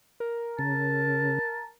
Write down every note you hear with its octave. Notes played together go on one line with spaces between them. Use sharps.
A#4
C#3 A5